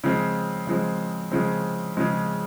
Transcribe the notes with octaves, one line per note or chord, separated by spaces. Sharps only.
C#3 F3 G#3 C4
C#3 F3 G#3 C4
C#3 F3 G#3 C4
C#3 F3 G#3 C4